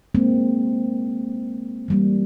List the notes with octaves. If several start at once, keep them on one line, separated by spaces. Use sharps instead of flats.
G#3 A#3 C4
E3 G3 A#3